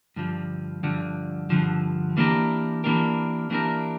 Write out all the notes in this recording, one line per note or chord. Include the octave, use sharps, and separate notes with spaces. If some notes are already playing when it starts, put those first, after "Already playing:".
G2 D3 F3
G2 D3 F3
G2 D3 F3
E3 A#3 D4 G4 A#4
E3 A#3 D4 G4 A#4
E3 A#3 D4 G4 A#4